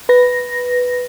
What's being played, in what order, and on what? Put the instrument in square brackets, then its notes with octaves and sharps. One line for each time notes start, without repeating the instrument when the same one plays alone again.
[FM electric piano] B4 A#6